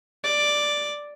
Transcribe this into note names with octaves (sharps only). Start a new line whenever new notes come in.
D5